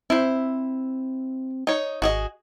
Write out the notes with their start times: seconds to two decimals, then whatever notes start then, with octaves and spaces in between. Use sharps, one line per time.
0.10 C4 E4 C5
1.67 D#4 C#5
2.02 G#1 F#4 G#4 D#5